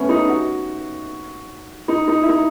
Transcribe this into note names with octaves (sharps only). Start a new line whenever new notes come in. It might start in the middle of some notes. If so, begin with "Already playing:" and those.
Already playing: A3 B3 C#4
D#4
F#4
D#4
D#4
E4
D#4